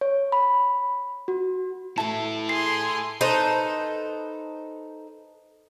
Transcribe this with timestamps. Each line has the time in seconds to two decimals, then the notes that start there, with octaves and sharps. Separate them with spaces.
0.01 C#5
0.32 B5
1.28 F#4
1.98 E3 A3 E4 A4 A5
2.49 G#4 C6 C7
3.21 D#4 A4 B4 C5